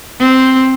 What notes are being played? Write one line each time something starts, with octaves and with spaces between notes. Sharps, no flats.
C4